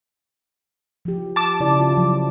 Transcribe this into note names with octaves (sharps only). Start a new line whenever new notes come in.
F3 G4
A5 D6
C#3 E4 D5
F4
F3 F#3